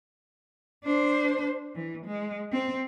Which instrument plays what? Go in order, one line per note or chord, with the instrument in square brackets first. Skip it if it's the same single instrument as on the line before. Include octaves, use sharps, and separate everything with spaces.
[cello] D4 C5
E3
G#3
C4